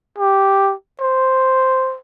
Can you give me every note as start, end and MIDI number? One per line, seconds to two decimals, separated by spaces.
0.19 0.73 67
1.00 1.97 72